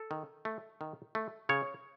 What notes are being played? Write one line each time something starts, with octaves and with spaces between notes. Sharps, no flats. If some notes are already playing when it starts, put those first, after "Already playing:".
Already playing: A4
D#3
A3
D#3
A3
C#3 C#5